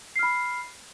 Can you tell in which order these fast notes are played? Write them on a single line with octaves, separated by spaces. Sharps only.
C7 F6 B5